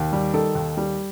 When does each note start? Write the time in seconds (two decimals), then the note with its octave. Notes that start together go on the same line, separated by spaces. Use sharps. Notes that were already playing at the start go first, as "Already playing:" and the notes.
Already playing: D#2
0.13 G3
0.33 D#3 A4
0.55 D#2
0.77 G3